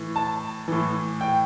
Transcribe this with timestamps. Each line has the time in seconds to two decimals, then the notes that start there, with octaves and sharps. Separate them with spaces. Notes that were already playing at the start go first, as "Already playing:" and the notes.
Already playing: A2 E3
0.16 A5
0.68 A2 E3
1.21 G5